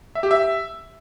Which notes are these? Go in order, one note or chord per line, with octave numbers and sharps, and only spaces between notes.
E5
G4
E5